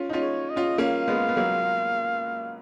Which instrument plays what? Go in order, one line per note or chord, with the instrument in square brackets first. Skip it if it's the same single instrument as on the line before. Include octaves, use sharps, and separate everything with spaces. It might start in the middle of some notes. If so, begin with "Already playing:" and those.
Already playing: [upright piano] C#4 F4
D#4
C#4 F4
[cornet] C#5
D#5
[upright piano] C#4 F4
[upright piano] A#3 C#4 [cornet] F5
[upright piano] G#3 B3
B3
F#3 A#3